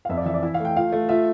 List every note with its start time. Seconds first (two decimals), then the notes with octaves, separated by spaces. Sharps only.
0.05 F5
0.09 F2 E5
0.17 D5
0.26 E3 E5
0.34 D5
0.43 E4 E5
0.54 F5
0.60 A3 G5
0.76 F4 F5
0.93 A3
1.09 F4 E5